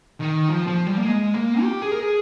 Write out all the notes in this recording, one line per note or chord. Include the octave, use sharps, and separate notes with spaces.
D#3
F3
F3
G3
A#3
G#3
A#3
G4
G#4
A#4
G#4